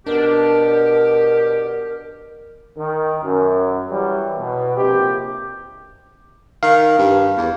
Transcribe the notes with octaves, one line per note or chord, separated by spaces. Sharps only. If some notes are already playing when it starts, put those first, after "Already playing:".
B2 B3 D4 G4 A#4
D#3
F#2
E3 F#3 G3
B2
A#1 C3 G4
D#3 F5
G2
E2